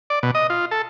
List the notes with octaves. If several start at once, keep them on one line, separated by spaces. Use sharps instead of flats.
D5
B2
D#5
F4
A4